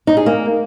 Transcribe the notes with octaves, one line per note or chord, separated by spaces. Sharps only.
D#4
G#4
A#3